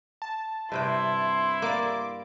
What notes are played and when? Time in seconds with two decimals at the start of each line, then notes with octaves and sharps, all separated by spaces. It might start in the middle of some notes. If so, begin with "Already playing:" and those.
0.22 A5
0.72 G2 C3 E4 G5 C6
1.62 A#3 D5 D6